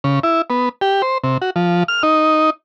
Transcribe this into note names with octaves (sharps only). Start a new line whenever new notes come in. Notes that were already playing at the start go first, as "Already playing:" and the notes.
C#3
E4
B3
G4
C5
C3
F#4
F3
F6
D#4